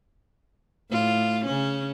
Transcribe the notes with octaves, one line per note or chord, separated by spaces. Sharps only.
A2 F4
C#3 C#4